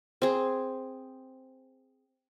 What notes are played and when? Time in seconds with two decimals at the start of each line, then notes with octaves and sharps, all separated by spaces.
0.22 C4 G#4